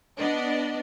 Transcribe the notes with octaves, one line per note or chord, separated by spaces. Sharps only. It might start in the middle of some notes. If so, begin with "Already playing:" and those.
B3 D4 D5 D#5